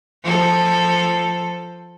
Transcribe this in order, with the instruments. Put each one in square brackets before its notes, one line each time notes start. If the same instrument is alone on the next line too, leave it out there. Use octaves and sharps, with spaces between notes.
[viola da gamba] F3 A4